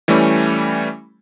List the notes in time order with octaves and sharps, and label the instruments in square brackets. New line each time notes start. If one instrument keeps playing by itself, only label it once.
[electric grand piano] E3 G3 A3 C#4